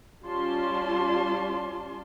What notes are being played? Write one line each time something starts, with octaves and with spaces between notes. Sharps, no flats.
G3 C#4 F4 D5 A5 C6